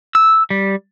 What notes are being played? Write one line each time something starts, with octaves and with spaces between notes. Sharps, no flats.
E6
G3